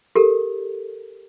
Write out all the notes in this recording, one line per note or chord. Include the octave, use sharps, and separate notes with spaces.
G4 A4 A#4